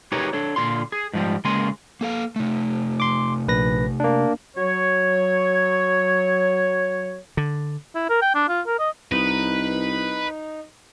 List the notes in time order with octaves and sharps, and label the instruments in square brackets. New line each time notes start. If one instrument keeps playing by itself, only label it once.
[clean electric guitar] D#4 G4 G#4 A#4 B4 C#5
D4 A4 C#5
A#2 D3 F4 C6
G#4
G#2 F3 G3
C#3 G#3 A#3 A#4 G#5 C6
[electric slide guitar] A#3 A4 F5
C3 A3
[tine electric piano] C6 D6
A#1 B4 A#6
A#3 D4
[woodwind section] F#3 C#5
[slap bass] D3
[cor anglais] E4
A#4
G5
D4
F4
A#4
D#5
[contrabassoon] C2 [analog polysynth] D#4 [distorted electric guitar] B4